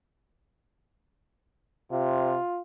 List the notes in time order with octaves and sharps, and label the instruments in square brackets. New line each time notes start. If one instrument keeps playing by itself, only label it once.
[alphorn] C3 [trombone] F4